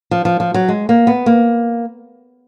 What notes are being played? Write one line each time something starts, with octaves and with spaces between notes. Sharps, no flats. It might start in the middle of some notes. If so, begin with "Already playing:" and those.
F3
F3
F3
F#3
G#3
A#3
B3
A#3